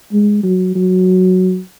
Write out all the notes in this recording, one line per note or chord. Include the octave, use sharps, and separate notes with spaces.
G#3
F#3
F#3